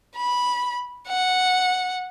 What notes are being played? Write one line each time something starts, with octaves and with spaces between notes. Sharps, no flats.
B5
F#5